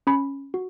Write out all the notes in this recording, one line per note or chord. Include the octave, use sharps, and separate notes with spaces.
C#4 B5
F#4